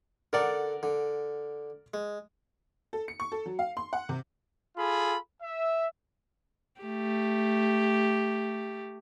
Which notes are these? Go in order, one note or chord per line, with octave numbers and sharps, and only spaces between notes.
D3 A4 A#4 D5 F#5
D3
G#3
A4
C#7
C#6
A4
F#3
F5
C6
F#5
C3
F4 G#4 A4 B5
E5
A3 G4